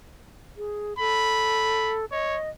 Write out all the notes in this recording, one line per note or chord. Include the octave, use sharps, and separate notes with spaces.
G#4
A4 B5
C#5 D#5